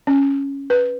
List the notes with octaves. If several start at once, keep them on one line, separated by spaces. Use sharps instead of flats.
C#4
B4